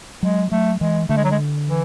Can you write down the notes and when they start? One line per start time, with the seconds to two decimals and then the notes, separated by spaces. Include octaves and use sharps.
0.23 F#3 G#3
0.52 F#3 A3
0.81 E3 G#3
1.09 D3 A3
1.17 G#3
1.24 F#3
1.31 G#3
1.68 E3